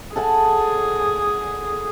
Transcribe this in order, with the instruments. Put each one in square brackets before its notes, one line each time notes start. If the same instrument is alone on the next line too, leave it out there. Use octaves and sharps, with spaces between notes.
[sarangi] G#4 [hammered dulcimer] A4 F#5 G#5